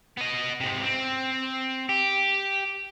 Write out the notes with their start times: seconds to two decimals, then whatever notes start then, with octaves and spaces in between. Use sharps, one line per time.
0.17 B3 D#5
0.60 G#2 C3
0.84 C4
1.89 G4